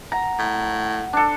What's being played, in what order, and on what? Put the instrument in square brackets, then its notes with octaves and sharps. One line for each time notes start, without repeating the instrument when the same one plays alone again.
[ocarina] F#5 [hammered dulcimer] A#5
[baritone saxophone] A2
[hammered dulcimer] D4 A4